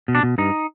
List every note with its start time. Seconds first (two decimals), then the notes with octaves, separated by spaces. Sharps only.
0.08 B2
0.15 D4
0.23 B2
0.38 G2 D#4